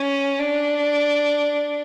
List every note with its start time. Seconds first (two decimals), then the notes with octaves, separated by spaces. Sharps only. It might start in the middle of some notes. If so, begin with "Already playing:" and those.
Already playing: C#4
0.39 D4